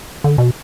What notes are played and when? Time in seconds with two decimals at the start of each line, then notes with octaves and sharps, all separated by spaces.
0.24 D3
0.38 B2